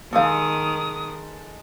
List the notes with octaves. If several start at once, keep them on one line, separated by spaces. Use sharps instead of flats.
D#3 G3 G#3 A4 F5 D#6